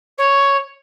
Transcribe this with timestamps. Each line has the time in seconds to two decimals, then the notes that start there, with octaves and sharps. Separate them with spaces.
0.18 C#5